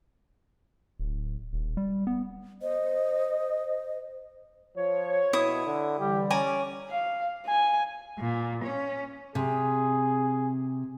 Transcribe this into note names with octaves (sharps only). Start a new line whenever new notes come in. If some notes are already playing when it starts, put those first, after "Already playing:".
D1
D#1
G3
B3
C5 D#5
F3 C#5
B2 E4 D#6
D3
D3 E3 G3 G4
C#4 D5 G#5 A#5
F5
G#5
A#2
C#4
C3 G#4